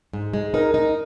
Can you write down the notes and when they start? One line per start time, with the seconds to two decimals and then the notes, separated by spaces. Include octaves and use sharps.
0.13 G#2
0.34 G#3
0.54 D#4 A#4
0.74 D#4